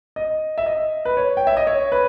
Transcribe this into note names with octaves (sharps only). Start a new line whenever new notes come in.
D#5
E5
D#5
B4
C#5
G5
E5
D#5
C#5
B4